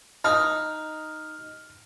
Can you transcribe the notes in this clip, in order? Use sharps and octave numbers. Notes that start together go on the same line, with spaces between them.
D#4 F6